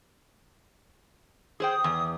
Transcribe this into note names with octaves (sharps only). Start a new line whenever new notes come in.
G#4 C5 G5 D#6
E2